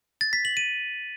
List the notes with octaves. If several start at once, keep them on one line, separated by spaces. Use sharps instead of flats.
A6
B6
F#7
D#7